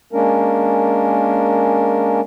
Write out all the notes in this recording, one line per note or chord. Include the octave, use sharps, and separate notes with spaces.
G#3 A#3 C#4 D4 A#4